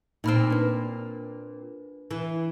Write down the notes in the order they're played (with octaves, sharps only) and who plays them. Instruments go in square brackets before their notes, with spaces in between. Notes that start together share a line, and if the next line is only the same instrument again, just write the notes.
[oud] A#2 C4 [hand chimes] D#4 B5 F6
[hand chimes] D4 B4
[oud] E3